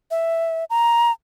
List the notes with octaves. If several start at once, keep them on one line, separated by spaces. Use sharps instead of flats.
E5
A#5